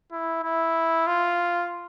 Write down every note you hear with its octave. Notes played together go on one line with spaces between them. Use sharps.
E4
E4
F4